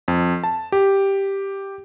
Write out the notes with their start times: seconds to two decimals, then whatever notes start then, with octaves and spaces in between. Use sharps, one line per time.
0.08 F2
0.44 A5
0.72 G4